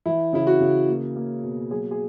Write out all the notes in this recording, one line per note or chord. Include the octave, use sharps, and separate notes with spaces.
E3 E4
C#3 E4
F#4
C#3
A#3
A#3
B2
F#3 G#4
G#4